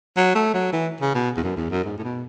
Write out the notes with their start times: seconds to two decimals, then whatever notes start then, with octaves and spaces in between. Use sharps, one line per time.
0.17 F#3
0.35 A3
0.54 F#3
0.73 E3
1.01 C#3
1.15 B2
1.37 E2
1.43 F#2
1.57 E2
1.71 F#2
1.84 G#2
1.98 A2
2.03 B2